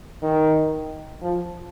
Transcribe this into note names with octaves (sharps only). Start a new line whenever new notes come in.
D#3
F3